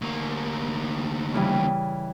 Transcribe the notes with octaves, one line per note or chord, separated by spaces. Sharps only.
D2 A#3
C#3 E3 G3